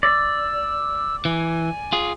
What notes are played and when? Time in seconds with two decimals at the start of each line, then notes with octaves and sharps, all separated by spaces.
0.03 D5 E6
1.25 E3 G#5
1.93 F4 G#4